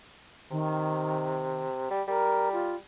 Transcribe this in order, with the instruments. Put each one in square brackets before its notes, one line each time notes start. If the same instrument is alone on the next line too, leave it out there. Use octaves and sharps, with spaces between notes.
[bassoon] C3 [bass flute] D#3
[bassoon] G3
[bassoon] G3 [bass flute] A#4
[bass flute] F4